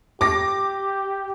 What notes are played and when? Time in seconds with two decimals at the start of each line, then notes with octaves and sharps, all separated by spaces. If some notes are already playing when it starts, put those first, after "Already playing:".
0.21 G4 D6 A#6